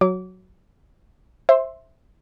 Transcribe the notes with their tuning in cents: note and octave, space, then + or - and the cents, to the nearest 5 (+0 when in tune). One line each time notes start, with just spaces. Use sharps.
F#3 +0 D6 -25
C5 +20 E5 +0 C6 +0